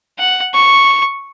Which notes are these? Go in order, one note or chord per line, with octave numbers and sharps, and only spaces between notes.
F#5
C#6